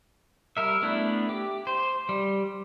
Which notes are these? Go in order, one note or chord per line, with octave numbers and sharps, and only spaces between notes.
G3 A#4 E5
A3 B3 D4 E4
G4
C5
G3